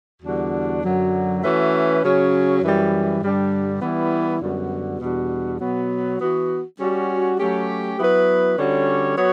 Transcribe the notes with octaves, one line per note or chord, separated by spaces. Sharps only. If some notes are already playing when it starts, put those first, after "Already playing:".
E2 D3 G3 D4 F#4
F#2 D3 F#3
E3 A3 C#4 F#4 B4
C#3 F#3 C#4
F#2 E3 G3
G2 D3 G3 D4
E3 G3 B3 E4
F#2 D3 G3 B3 F#4
E2 B2 G3 D4 F#4
B2 F#3 B3 F#4
E3 B3 F#4
G3 C#4 F#4
F#3 A3 C#4 G4
F#3 B3 E4 B4
D3 G3 C#4 F#4 C#5
F#3 B3 F#4 C#5